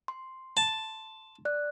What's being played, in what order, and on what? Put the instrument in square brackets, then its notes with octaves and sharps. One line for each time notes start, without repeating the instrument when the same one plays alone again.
[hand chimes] C6
[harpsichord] A5
[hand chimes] D5 F#6